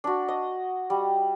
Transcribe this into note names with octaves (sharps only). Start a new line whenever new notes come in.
D4 F#4
D#5
G3